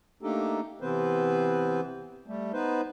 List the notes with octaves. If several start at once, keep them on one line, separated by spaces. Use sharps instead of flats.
A3 A#3 D4 D#4 G4 A4
C3 E3 B3 C4 B4 C5
G3 A3
B3 D#4 B4 C5